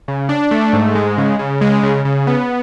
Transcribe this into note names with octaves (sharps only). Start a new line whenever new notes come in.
C#3
D4
A3
G#2
G#3
C#3
C#3
G#3
C#3
C#3
B3